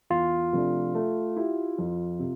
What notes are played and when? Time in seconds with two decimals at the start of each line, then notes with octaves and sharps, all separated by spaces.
0.10 E2 F4
0.53 C3 F3 A3 D4
0.95 A3
1.37 E4 G4
1.78 F2
2.19 C3